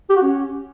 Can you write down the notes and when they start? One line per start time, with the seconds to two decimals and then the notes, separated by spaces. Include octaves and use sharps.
0.09 G4
0.16 F#4
0.22 C#4